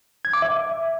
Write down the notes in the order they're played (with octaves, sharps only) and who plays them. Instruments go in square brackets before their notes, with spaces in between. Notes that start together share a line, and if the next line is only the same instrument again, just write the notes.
[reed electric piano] G#6
D6
E5